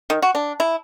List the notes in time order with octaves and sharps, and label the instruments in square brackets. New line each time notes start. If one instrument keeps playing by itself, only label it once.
[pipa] D#3
F#4
D4
E4